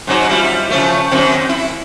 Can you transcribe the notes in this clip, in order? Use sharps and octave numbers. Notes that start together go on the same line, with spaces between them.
G#2 F#3 D#4
G3 E4 F4
C#3 F3 A3
F#2 D#3 C4
E4